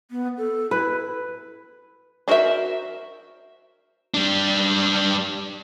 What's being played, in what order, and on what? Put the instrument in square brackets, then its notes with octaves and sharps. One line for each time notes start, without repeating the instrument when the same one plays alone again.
[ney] B3
A4
[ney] E4 [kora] B4
[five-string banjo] D4 F#4 A#4 C5 E5
[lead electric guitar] G3 D4